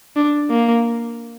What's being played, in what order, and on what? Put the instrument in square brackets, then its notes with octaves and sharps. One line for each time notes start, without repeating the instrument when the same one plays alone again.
[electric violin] D4
A#3